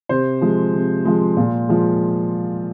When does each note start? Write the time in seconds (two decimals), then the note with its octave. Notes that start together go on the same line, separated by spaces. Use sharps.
0.09 C3 C5
0.41 F3 G#3
0.74 C3
1.05 F3 G#3
1.37 A#2
1.69 F3 G#3